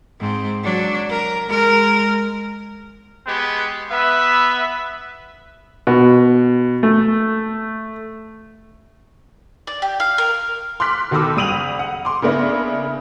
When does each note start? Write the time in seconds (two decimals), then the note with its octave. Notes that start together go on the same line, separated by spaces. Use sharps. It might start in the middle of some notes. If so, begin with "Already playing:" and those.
0.20 G#2 C4
0.63 F#3 D4
1.09 A#4
1.48 G#3 A#4
3.27 G#3 B3 G4
3.91 B3 B4 E5
5.87 B2
6.83 A3
9.67 D5
9.82 G4
10.00 F5
10.18 A#4
10.80 C6 D6 F6 F#6 B6
11.11 B2 D#3 A4 B5 D6 E6
11.36 F#1 G3 D#6 D#7 F7 F#7
11.79 F#5
12.05 C6 D6
12.22 C#3 A#3 B3 D4 E4